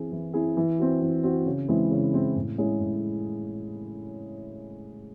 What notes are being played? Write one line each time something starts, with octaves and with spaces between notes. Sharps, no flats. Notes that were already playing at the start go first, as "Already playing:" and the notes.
Already playing: E3 C4 E4 G#4
E3
C4 E4 G#4
E3
C4 F#4
E3
C4 F#4
C#3
E3 G#3 C4 E4
C#3
E3 G#3 C4 E4
A2
G#3 C#4 E4 G#4
A2